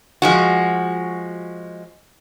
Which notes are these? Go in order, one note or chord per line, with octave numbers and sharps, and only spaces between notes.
F3 G#3 F#4